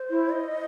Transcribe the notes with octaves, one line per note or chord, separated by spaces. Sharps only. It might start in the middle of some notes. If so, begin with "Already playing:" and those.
Already playing: C5
E4
D#5